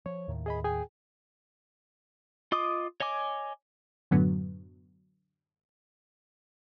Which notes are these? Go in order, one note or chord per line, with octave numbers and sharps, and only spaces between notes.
F3 C#5
D#2 A2 D#3
G#4 D#5 B5
G#4 G5 G#5
F4 D#5 D6 D#6
C#5 D#5 G#5 D6
F#2 A2 D3 F#3 B3